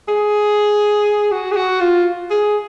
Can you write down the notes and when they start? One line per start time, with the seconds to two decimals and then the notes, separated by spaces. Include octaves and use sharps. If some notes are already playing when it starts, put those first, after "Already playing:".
0.08 G#4
1.31 F#4
1.51 G#4
1.56 F#4
1.80 F4
2.30 G#4